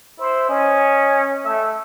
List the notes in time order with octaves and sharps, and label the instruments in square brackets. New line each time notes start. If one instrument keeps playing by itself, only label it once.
[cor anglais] E4 [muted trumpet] C5
[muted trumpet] C#4 [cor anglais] D#5
[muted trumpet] A3 [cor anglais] E5